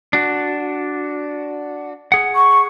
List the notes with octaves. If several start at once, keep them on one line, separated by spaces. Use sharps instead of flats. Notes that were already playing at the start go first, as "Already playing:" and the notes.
D4 F#4
G#4 F#5
C#6